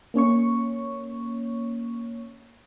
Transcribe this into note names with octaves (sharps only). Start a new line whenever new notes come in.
A#3 C#4 C#5 C#6